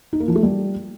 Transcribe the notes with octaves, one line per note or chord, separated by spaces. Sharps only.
D#4
A#3
F3
A3
G3